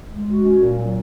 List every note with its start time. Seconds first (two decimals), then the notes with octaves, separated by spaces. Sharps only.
0.10 G#3
0.27 F#4
0.43 C#4
0.60 A#2
0.77 F#3